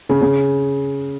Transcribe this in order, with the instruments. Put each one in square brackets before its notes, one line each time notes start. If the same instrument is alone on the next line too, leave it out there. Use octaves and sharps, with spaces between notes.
[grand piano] C#3
C#3